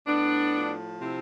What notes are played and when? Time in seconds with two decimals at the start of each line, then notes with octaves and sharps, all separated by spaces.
0.06 A2 B3 D4
0.53 F3
1.00 C3 C4 E4